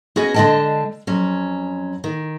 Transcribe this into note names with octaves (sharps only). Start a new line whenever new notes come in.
B3 C#4 F#4 G#4 D#5 G#5
D3 G#3 D4 D#5 G5 A5
F2 F#3 C#4
D#3